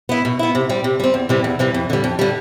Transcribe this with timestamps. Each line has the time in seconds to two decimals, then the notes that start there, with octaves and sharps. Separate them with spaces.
0.09 B3 E4
0.25 B2
0.39 B3 E4
0.55 C3
0.69 G3 C4
0.84 C3
1.00 G3 C4
1.14 E2
1.29 C3 E3 G3
1.44 E2
1.59 C3 E3 G3
1.74 F2
1.90 D3 G3
2.04 F2
2.19 D3 G3